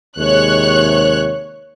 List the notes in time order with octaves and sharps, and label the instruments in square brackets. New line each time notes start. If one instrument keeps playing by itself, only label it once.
[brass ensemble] D#2 C3 G#3 [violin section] C#5 F#6